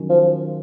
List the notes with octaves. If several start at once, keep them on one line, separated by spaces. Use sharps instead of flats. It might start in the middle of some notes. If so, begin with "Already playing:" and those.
Already playing: D#3 F#3 C#4
F3